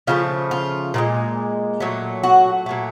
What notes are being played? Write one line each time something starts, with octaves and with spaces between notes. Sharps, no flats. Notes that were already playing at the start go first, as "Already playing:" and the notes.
C#3 F3 A3 F4
F4
A#2 F3 G#3
A#2 F#3 A3
F#4
A#2 F#3 A3